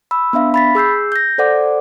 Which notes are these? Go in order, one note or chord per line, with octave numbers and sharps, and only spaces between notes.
B5 E6
B3 D4 E5 F5
B5 A6 B6
G#4 E6 G6 C7
G6 A#6
A4 C5 D5 F#5 D6